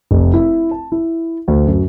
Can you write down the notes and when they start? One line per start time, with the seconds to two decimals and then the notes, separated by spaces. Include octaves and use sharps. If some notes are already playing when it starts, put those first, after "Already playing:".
0.11 F1
0.34 E4
0.71 A5
0.92 E4
1.48 D2
1.67 F#2